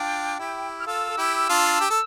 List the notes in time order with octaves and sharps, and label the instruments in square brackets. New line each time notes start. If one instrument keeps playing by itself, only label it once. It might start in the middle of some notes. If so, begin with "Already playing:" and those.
Already playing: [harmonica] D4 F4 [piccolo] G5
[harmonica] E4 G4
[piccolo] F6
[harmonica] F4 A4 [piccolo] E6
[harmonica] A4
E4 G4
D4 F4
G4
A4